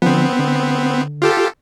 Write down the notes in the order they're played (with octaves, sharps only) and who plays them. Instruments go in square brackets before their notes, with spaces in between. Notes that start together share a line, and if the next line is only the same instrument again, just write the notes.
[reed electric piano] D3 F3 [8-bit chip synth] B3 C4
[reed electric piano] D3
[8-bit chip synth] F4 G4 A4